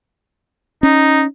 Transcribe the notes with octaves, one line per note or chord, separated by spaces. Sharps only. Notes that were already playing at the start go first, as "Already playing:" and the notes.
C#4 D#4